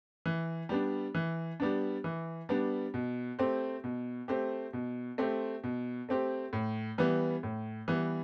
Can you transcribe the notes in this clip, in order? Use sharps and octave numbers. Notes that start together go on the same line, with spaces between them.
E3
G3 B3 D4
E3
G3 B3 D4
E3
G3 B3 D4
B2
A3 C4 G4 C5
B2
A3 C4 G4 C5
B2
A3 C4 G4 C5
B2
A3 C4 G4 C5
A2
E3 G3 B3
A2
E3 G3 B3